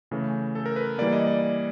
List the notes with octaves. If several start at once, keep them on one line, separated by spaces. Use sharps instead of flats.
C#3 E3 A3 C#4
A4
A#4
B4
E3 G3 A#3 D5
D#5
D5